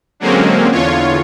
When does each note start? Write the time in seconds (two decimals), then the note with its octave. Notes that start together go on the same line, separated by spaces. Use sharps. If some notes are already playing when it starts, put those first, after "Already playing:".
0.20 D3 F#3 G#3 A#3 C4 C#4
0.71 E2 D3 F4 C#5